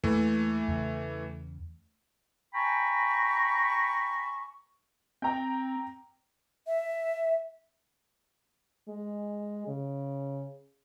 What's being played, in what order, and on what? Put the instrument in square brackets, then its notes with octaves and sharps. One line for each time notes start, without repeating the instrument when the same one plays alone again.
[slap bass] E2 A#3 [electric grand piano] E3 A3
[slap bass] E2 C#3
[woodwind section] G5 G#5 A#5 B5 C#6
[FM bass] C4 [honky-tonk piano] G5 A#5
[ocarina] E5
[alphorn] G#3
C#3